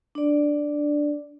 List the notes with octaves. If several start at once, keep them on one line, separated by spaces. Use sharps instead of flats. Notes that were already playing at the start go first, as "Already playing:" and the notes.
D4 D5